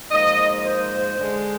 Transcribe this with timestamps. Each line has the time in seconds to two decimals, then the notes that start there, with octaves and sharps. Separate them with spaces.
0.11 G#2 F3 A#3 D#5
0.63 C5
1.16 D3 G#3